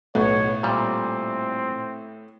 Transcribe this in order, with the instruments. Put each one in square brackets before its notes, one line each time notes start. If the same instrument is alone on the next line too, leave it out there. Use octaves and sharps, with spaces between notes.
[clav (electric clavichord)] B1 [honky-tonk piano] A2 B3 [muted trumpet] C#5
[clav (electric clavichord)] A#2 G3 [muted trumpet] C4